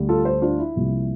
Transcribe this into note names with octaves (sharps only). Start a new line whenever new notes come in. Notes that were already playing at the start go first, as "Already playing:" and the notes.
Already playing: D2 D3 G3
F4 A4
A4 C5
D4 F4
E4
C2 C3 F3 A#3